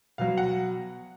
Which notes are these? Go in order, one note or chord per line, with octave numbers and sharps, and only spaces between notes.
B2 F#3 F5
F#5